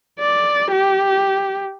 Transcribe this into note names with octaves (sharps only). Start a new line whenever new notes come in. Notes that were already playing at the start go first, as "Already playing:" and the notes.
D5
G4